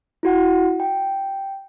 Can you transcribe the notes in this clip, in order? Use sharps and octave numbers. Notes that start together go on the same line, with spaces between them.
E4 F#4 F#5
G5